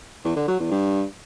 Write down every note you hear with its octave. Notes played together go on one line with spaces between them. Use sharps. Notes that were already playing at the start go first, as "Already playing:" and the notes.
E2
D3
F#3
E2
G2